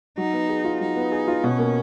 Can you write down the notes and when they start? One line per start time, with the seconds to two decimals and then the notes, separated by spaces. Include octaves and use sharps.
0.17 F#3 D#4
0.33 B3
0.49 G#4
0.65 F4
0.81 F#3 D#4
0.96 B3
1.12 G#4
1.28 F4
1.43 B2 C#4
1.59 A#3